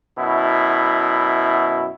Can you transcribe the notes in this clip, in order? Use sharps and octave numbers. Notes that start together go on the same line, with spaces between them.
F#2 B2 E4